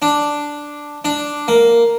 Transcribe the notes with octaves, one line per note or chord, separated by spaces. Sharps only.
D4
D4
A#3